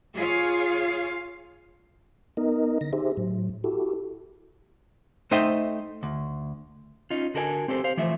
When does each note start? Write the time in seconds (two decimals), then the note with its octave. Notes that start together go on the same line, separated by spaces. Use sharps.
0.15 F4 G#4 C#5 F5
2.37 B3 D#4 A#4 D#5
2.81 D3 A#6
2.93 D#4 G4 G#4 C5 E5
3.17 A2 F#3
3.64 E4 F#4 G4 A4
5.31 A3 D#4 C5 D#5 E5 G5
6.03 D2
7.10 C#4 D#4 F4
7.34 D3 F#4 A4 A#4 C#5 G#5
7.68 C4 G4 A4 C5
7.84 C5 F5
7.97 E3 F3 A3 E5